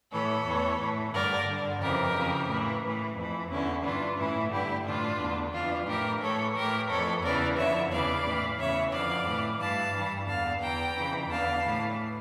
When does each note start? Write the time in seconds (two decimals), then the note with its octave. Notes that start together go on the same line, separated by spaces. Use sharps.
0.12 A2 E3 A4 C#5
0.46 E2 E3
0.79 A2 E3
1.13 G2 D3 A#4 D5
1.47 G2 D3
1.81 F2 C#3 E3 G4 A#4
2.15 F2 C#3 E3
2.48 A2 E3
2.82 A2 E3
3.16 F2 E3
3.50 E2 D3 C#4 E4
3.84 G2 E3 D4 F4
4.18 A2 E3 C#4 E4
4.51 G2 D3 E4 G4
4.86 A2 E3 D4 F4
5.19 E2 D3
5.53 F2 E3 D4 F4
5.87 A2 E3 G4 A#4
6.21 A2 E3 A4 C#5
6.56 A2 E3 G4 A#4
6.89 F2 E3 A4 C#5
7.22 E2 C#3 E3 A#4 D5
7.57 F2 D3 C#5 E5
7.91 E2 C#3 E3 D5 F5
8.25 A2 E3
8.58 E2 C#3 E3 C#5 E5
8.91 F2 D3 D5 F5
9.27 A2 E3
9.59 G2 E3 F5 A5
9.93 G2 E3
10.27 E2 D3 F5 A5
10.61 E2 E3 G5 A#5
10.95 F2 C#3 E3
11.29 E2 D3 F5 A5
11.63 A2 E3